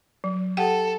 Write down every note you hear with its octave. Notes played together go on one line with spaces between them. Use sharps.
F#3
G4 A4 F#5 G5